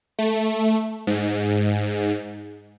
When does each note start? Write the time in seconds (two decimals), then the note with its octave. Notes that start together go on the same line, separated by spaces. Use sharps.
0.19 A3
1.07 G#2